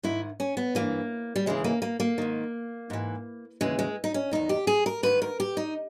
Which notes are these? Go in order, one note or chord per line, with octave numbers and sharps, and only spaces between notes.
G#2 D#3 E4
C#4
B3
G2 E3 A#3
G3
D#2 C#3 E3 G#3
A#3
A#3
A#3
G#2 D#3
G#2 E3
D#2 C#3 E3 G#3
G#3
D#4
C#4
E2 D#3 D#4
G4
G#4
A#4
G#2 D#3 B4
A#4
G4
D#4